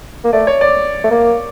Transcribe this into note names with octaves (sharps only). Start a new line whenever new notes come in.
A#3
A3 D5
C#5
D5
A3
A#3